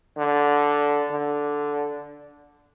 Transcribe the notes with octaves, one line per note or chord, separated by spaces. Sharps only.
D3
D3